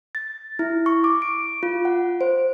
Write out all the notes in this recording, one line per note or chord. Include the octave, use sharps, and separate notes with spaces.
A6
E4
C#6
D6
D7
F4
F#5
C5